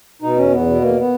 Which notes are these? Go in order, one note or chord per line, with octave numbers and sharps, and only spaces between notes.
B2 D#4
E2 C#4
E2 B3
B2
E2 A#3
B3